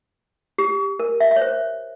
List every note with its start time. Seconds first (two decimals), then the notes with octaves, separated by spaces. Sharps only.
0.58 G4
0.99 A#4
1.20 E5
1.31 E5
1.36 C#5
1.41 C5